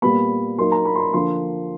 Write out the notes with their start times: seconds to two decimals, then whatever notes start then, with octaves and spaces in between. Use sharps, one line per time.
0.02 A#2 G3 B3 B5
0.58 F#3 A#3 D#4 C6
0.72 A#5
0.85 B5
0.95 C6
1.00 B5
1.13 D3 F3 A#3 C6